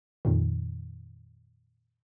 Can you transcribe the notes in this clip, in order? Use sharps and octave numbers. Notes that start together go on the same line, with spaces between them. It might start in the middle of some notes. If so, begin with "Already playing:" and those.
F2 A#2 D#3